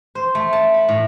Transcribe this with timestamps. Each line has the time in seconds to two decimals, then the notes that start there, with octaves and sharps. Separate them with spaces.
0.15 C5
0.35 A3
0.53 A5
0.74 B5
0.88 A2